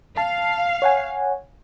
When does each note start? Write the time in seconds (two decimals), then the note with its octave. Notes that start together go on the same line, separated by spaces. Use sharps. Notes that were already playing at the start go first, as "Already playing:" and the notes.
0.17 F5 A5
0.82 C#5 F#5 G#5